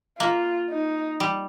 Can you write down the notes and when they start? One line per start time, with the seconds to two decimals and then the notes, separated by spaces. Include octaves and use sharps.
0.19 A#3 F4
0.70 D#4
1.20 G3